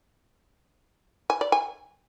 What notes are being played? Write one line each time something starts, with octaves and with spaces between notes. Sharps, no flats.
G#5
D5
G#5